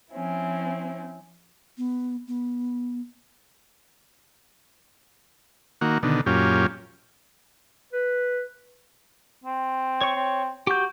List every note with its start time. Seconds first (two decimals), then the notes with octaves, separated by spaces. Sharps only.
0.13 F3 C4 C#4 E4
1.78 B3
2.28 B3
5.81 D#3 A#3 F#4
6.03 B2 D3 D#3
6.26 F#2 A#2 C#4 F4 G4
7.93 B4
9.44 C4
10.01 C#5 C#6
10.16 C4
10.67 F#4 G4 G6